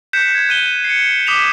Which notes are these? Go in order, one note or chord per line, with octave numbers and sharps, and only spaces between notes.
F#6 G6 B6 C#7 E7
G#6
F#6 D#7 G7
C7 C#7
D6 D#6 B6 E7 F7 G7